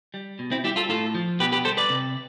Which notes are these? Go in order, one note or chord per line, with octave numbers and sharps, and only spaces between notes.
G3
B2
C4 E4
G3 E4 G4
F4 A4
A2 F4 A4
F3
B2 G4 B4
G4 B4
G3 A4 C5
B4 D5
C3